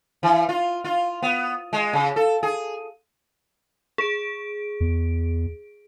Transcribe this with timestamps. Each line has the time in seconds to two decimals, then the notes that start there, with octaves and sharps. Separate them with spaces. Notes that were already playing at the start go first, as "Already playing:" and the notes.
0.23 E3
0.49 F4
0.84 F4
1.22 B3
1.73 G#3
1.93 C#3
2.16 A4
2.43 G#4
3.98 G#4 D7
4.80 E2